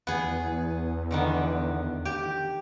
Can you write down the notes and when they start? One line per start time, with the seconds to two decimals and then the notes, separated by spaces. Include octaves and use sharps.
0.07 E2 B3 G#4
1.11 D3 D#3 B3
2.05 G4